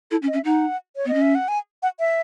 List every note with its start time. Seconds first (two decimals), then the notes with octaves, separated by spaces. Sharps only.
0.11 E4 A4
0.22 C#4
0.28 D#5
0.33 C#4
0.36 E5
0.45 D#4 F#5
0.96 C#5
1.05 B3 D#5
1.14 C#4
1.21 E5
1.35 F#5
1.48 G#5
1.83 F#5
1.99 E5